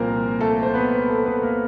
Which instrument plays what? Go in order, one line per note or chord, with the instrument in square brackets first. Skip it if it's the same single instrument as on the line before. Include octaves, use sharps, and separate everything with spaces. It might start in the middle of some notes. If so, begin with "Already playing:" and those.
Already playing: [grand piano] C2 A#2 F3 A#3 C4 A#4 C5
A3 A4
C5
B3 B4
A3 A4
B3 B4
A#3 A#4